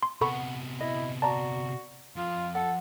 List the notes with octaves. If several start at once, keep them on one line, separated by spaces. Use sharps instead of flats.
C6
C3 B3 A4 F#5 B5 C#6
E4 D#5
F#4 D5 A5 A#5
F2 F4
A4 F#5